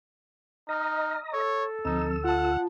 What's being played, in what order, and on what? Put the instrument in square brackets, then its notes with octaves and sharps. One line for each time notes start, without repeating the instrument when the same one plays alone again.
[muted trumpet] D#4 [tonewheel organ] D#5 A#5 [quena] F6
[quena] A4 [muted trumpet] C#5 [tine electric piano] E6
[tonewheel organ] D2 E6 [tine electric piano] F3 C4 [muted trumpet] D#4
[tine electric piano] F4 A5 [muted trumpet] F#5